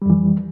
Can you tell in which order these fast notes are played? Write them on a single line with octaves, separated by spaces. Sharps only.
G3 F2 E3